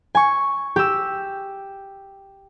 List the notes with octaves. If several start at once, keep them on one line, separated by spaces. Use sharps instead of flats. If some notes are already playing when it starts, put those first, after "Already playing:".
G#5 C#6
G4 E6